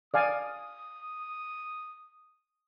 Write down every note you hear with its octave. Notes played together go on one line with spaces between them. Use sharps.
D5 F5 G#5 D#6